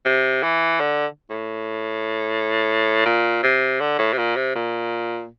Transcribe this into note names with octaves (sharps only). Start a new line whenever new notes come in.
C3
E3
D3
A2
A#2
C3
D3
A2
C3
A#2
C3
A#2